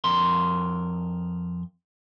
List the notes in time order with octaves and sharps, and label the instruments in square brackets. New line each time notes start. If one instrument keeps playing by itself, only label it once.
[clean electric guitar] F2 A#4 C6